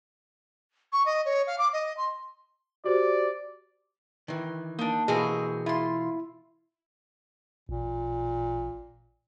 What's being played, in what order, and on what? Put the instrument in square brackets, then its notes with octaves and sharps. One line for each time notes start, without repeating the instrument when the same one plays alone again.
[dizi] C#6
D#5
C#5
F5
D6
D#5
C6
[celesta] F#4 G4 C5 [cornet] D5
[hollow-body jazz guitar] D#3 E3
[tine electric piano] A#3 [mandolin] D4 D#4
[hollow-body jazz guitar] B2 E3 A#3 [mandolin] C4 [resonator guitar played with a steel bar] F#4 G#4 [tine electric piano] D#5
[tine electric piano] E4 [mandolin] F4 C6
[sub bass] A1 [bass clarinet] A#2